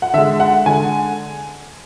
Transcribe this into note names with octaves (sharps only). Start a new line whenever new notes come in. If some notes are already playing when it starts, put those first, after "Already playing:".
F#5
D3 G#3 E5
F#5
D3 G#3 G#5